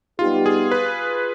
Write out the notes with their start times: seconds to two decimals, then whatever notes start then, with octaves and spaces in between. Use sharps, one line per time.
0.19 G3 B3 D#4 F4 G4
0.46 G#4
0.71 B4